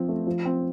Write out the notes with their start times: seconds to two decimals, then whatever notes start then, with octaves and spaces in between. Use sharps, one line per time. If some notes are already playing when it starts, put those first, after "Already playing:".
Already playing: F3 C4
0.09 A3
0.27 F3
0.45 C4